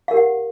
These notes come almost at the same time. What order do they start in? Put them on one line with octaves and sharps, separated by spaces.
F5 A#4 G4 F#5